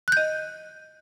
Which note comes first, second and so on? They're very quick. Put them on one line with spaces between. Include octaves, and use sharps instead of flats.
F#6 G6 D#5